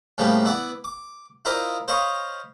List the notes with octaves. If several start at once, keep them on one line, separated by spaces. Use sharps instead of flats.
A2 C#3 F3 G3 A#3 B3
B3 E4 D5 F#5
D6
E4 F4 A#4 C5 D5 D#5
C5 C#5 D#5 F5 B5 C#6